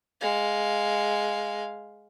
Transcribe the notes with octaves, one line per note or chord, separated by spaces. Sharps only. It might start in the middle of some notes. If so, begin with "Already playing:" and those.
G#3 F5